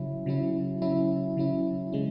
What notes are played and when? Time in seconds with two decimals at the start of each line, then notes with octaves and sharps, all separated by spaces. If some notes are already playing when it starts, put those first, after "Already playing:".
Already playing: C#3 F#3 C#4 E4
0.26 C#3 F#3 C#4 E4
0.82 C#3 F#3 C#4 E4
1.37 C#3 F#3 C#4 E4
1.93 C#3 G#3 C#4